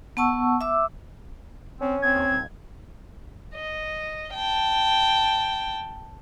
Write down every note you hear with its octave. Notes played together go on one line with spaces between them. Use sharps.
B3 F#5 A5 C#6 E6
E5 D6 E6
C4 C#4
C4 G#6
D#2
D#1
D#5
G5 A5